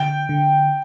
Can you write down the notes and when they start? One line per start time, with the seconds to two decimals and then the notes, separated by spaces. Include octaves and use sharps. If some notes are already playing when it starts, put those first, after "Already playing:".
Already playing: D3 G5
0.29 D3